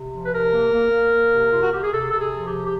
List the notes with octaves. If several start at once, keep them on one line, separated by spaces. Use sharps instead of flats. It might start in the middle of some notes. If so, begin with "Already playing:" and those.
Already playing: C3
F3
B4
C3 A#4
A#3
A#3
A#3
A#3
C3
C3 F4
F#4
C3 G4
G#4
C3 A4
C3 A4
G#4
F3
G4
C3
G4